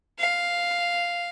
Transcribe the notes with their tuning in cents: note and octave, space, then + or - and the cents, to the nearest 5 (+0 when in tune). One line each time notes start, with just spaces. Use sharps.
F5 +0